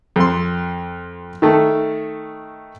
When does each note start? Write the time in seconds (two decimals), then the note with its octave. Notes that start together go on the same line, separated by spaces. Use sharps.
0.16 F2 C6
1.42 D#3 A3